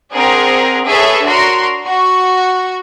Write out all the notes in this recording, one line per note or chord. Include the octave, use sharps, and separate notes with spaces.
C4 D4 G#4 A#4 F#5
G#4 A4 B4 C#5 E5
D4 F#4 A#4 C6
F#4 C#6